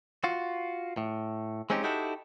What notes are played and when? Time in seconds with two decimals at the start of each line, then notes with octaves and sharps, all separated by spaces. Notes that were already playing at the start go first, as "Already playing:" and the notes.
0.24 F4 F#4
0.97 A2
1.70 G#3 C4 C#4 D#4 G4
1.84 D#4 E4 F#4 G4 A4